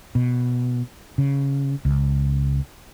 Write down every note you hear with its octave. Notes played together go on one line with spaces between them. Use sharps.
B2
C#3
C#2